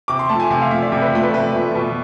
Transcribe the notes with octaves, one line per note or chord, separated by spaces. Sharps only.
C3 D6
C6
F3 A3 A5
G#5
C3 G#5
F5
F3 A3 E5
D5
C3 E5
B4
F3 A3
B4
C3 B4
F3 A3
B2